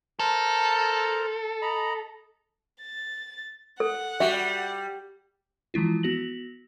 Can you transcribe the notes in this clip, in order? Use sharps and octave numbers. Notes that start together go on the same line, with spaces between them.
A4 A#4 C5 A#5
D#5 A#5 B5
A6
A4 F#5
G3 F#4 E5
E3 F3 G#3 E4 F4
B3 F#4 A#6 F#7